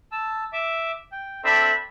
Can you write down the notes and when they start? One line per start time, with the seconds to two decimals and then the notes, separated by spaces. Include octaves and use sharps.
0.12 A5 E6
0.53 E5 D6
1.12 G5
1.44 C4 D4 A4 E5 B5